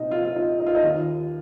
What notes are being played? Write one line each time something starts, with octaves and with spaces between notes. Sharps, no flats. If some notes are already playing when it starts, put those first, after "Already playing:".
Already playing: C2 A#2 C4 D#4
F4
F4
D#4
D#4
F4
D#4
D#2 D#3 F4